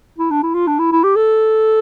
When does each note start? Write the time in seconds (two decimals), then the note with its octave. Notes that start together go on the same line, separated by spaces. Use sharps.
0.18 E4
0.31 D4
0.43 E4
0.54 F4
0.67 D4
0.79 E4
0.92 E4
1.04 G4
1.16 A4